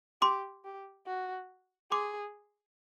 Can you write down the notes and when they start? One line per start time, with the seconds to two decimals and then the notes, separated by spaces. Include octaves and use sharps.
0.22 G4 C6 D6
0.65 G4
1.06 F#4
1.92 G#4 C6 D6